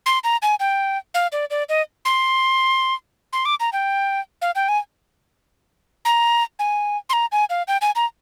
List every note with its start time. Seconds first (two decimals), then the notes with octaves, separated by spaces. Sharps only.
0.06 C6
0.24 A#5
0.42 G#5
0.60 G5
1.14 F5
1.32 D5
1.50 D5
1.69 D#5
2.05 C6
3.33 C6
3.45 D6
3.60 A#5
3.73 G5
4.41 F5
4.55 G5
4.68 G#5
6.05 A#5
6.59 G#5
7.09 C6
7.13 A#5
7.32 G#5
7.50 F5
7.68 G5
7.81 G#5
7.95 A#5